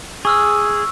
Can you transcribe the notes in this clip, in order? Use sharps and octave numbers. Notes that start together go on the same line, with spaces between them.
G#4 C#6 E6 F6